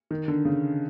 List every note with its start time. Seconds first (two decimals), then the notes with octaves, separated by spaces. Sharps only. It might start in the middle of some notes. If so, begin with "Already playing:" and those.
0.11 D#3
0.28 D3
0.45 C#3